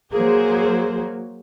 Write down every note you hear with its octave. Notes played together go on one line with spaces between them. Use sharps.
F#3 A#3 G#4 C5